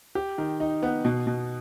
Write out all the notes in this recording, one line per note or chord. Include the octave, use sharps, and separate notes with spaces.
G4
D#3
D#4
B3
B2
B2